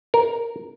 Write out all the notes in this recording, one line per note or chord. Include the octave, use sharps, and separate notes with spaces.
A#4